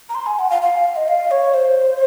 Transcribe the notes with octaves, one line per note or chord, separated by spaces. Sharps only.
A#5
C6
G#5
F#5
F5
F5
D#5
F5
C#5
C5